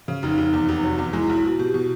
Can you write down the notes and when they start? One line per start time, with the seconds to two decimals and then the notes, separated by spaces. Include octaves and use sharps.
0.08 C#3
0.23 F1 D#4
0.38 F1
0.53 E2
0.69 F1
0.83 F#3
0.98 E2
1.13 G#3 E4
1.29 B1
1.45 B2
1.59 B2 G4
1.74 B2